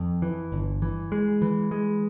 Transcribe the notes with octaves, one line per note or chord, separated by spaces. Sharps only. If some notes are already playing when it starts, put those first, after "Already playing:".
Already playing: F2
E3
G1
E3
G#3
E3
G#3